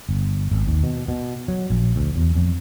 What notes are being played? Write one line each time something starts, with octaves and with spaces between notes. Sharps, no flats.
G1
G#1
D#2
B2
B2
F#3
A#1
D2
E2
F2